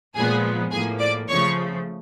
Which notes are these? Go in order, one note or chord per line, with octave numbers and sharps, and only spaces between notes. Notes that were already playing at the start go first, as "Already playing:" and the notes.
A#2 F3 G#3 B3 G#4 G#5
A2 F3 A#3 G#4 G#5
D5 D6
C#3 F3 A3 C#5 C#6